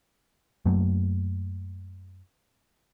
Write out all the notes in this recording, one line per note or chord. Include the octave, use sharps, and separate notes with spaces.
F#2 F#3 A3 A#3